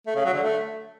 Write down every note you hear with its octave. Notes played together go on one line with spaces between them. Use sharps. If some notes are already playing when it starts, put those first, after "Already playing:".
A3
C#3
F#3
D3
A3